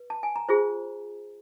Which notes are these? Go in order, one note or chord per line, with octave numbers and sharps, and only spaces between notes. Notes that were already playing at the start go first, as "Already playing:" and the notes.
Already playing: B4
A5
G#5
A#5
F4 G#4 C5